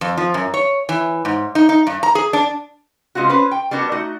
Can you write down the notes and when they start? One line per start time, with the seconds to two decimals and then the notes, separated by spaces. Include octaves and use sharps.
0.01 F2
0.17 F3
0.34 F#2
0.54 C#5
0.89 E3
1.25 G#2
1.55 D#4
1.69 D#4
1.87 G2
2.03 A#5
2.15 G#4
2.33 D4
3.15 C#3 G#3 C4 F4 F#4
3.29 C#4 B4 C5
3.51 G5
3.71 G3 B3 D4 F#4 A#4
3.92 A3 D#4 F#4